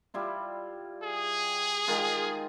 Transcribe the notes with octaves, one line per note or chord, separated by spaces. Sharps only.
G3 E4 F4
G#4
D#3 G#3 F4